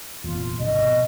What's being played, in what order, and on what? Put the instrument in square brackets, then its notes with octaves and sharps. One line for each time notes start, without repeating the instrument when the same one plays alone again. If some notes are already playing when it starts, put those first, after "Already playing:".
[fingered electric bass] F1 E2 A#2 [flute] F4
[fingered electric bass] G#1 C3 F3 [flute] D#5
[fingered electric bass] B2